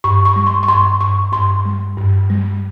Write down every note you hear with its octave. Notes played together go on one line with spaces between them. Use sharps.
G2 C#6
C#6
G3
C6
C#6
G2 C6
G2 C#6
G2 C6
G3
G2
G3